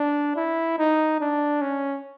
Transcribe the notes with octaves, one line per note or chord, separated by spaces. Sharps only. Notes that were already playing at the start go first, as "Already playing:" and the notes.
Already playing: D4
E4
D#4
D4
C#4